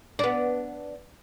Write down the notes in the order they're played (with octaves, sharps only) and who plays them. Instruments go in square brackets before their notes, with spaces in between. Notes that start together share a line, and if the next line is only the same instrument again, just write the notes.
[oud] B3 D4